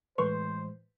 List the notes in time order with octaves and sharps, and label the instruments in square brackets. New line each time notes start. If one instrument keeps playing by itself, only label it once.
[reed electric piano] A2 E3 G#3 [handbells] B4 C6 C#6 [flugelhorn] C5